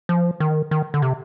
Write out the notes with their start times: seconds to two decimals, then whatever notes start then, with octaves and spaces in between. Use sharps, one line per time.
0.09 F3
0.40 D#3
0.71 D#3
0.94 D3
1.02 C3